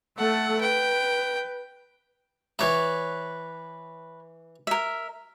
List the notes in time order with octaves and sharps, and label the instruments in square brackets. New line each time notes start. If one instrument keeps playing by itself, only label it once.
[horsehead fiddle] A3 A4 [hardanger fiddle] F#5
[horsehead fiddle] B4 [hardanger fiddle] G5
[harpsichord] E3 D5 E5 [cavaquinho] B4 C#5
[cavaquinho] A#4 E5